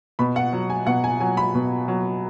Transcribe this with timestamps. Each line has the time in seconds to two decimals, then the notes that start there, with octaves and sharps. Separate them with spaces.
0.19 B2 B5
0.36 F#5
0.53 F#3
0.70 G#5
0.87 B2 F#5
1.04 G#5
1.20 F#3 G#5
1.37 B5
1.55 B2
1.88 F#3